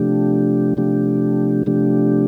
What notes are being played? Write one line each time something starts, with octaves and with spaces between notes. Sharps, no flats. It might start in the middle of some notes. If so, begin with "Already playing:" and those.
Already playing: C3 F3 A3 D4 G4
C3 F3 A3 D4 G4
C3 F3 A3 D4 G4